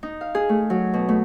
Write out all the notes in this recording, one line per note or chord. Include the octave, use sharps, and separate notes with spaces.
D#4
F5
G#4
A3
F#3
B2
A3